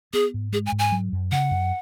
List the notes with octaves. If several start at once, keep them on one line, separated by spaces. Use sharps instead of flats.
B3 G#4
G#2
G#3 G#4
G#5
G#2
G#5
F#3
F#2
C#3 F#5
F#2